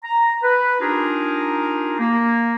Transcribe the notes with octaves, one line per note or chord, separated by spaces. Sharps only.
A#5
B4
D4 D#4 F4 G4 G#4 A#4
A#3